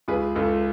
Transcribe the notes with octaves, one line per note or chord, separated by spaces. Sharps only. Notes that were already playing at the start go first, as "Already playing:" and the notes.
C#2 G#4 B4
C#2 A4